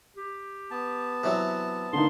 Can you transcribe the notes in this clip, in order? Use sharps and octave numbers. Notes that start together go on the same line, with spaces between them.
G4
B3 A5
C3 E3 F#3
D3 A#3 D#4 C6